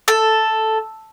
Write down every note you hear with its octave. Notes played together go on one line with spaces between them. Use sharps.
A4